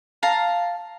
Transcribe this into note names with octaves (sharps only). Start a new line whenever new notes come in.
F5 A5 A#5